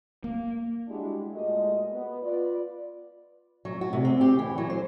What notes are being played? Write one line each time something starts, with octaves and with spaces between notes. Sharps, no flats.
A#3
G3 G#3 D4 E4 F#4 G4
A#2 G#3 A3 F#4 D#5
B3
F4 B4 D5
F#3
F#4
C3
C4
G4
E3
F#3
C5